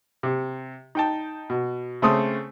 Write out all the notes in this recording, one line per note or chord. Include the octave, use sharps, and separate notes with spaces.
C3
D#4 G5 A5
B2
C#3 A3 C4 C6 D#6